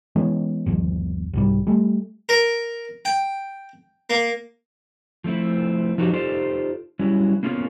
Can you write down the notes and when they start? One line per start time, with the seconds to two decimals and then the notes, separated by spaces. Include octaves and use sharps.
0.16 E3 G#3 B3 C#4
0.66 G1 D#2 F3
1.33 C2 G#2 G3
1.67 G3 A3
2.29 A#4
3.05 G5
4.10 A#3
5.24 F3 A3 C4 E4
5.98 F3 F#3 D#4 F#4 G4
6.13 D#4 F4 G4 A4 C5 D5
6.99 F#3 G3 C#4 E4
7.43 A#3 B3 C#4 F4 G#4 A#4